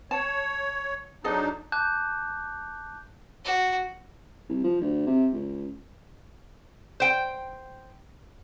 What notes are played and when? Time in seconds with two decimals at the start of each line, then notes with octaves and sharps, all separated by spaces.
0.11 C#5 A5
1.24 F#3 D4 D#4 G#4 A4 D#5
1.72 A5 D6 F#6 G6
3.45 F#4
4.49 C2
4.64 F3
4.81 D2
5.07 C3
5.32 C#2
7.00 C5 G5